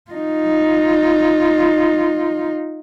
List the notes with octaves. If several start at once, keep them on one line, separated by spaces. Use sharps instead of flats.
D#4 F4